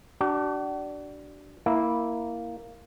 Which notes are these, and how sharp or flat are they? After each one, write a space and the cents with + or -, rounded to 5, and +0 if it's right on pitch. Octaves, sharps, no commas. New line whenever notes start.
D4 +0 F#4 +45
A#3 +0 E4 -10